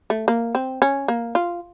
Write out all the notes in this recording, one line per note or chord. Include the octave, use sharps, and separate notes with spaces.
A3
A#3
C4
C#4
A#3
F4